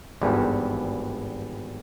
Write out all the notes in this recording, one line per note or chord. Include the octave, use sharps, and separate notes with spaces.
G#1 E2 G2